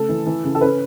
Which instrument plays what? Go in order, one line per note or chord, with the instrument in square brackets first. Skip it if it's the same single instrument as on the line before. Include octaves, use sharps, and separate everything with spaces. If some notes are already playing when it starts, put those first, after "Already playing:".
Already playing: [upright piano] C#3 A3 A4
E3
E3
C#3
A4
C#4 B4